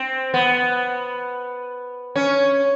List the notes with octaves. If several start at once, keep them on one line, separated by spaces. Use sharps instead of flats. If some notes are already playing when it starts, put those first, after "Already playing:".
Already playing: C4
B3
C#4